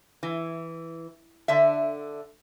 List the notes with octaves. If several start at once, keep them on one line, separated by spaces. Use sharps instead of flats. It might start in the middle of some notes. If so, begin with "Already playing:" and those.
E3
D3 D4 E5